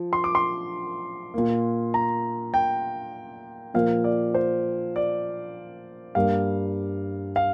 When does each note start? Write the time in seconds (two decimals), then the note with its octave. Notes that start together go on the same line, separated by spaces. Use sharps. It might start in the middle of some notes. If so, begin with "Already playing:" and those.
Already playing: F3
0.13 C6
0.24 D6
0.35 C6
1.34 A#2 A#3
1.94 A#5
2.54 G5
3.74 A#2 F3 A#3 F5
4.04 D5
4.34 C5
4.96 D5
6.15 G2 G3 A#3 F5
7.36 F5